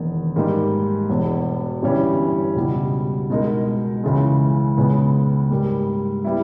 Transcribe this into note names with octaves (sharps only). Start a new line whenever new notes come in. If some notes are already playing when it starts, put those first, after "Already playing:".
Already playing: E1 E2 D#3 A#3
G#2 G3 A#3 D#4
E1 E2 B2
G1 G2 E3 G3 C#4
C#2 B2 G3
B2 G#3 D#4 A#4
C#2 C#3 E3 G#3
C#2 C#3 G#3 B3
G#2 G3 A#3
G3 B3 E4